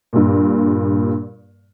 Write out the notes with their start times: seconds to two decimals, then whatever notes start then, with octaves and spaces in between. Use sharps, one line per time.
0.13 G2 A#2